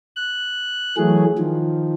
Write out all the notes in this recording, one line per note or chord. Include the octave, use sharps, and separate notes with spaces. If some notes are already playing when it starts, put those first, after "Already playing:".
F#6
E3 F#3 A3 G#4
D#3 F3